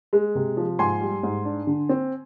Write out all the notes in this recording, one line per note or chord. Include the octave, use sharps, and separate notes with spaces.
G#3
C3
F3
G#2 G#5 C6
G3
G#2
D4
D3
C4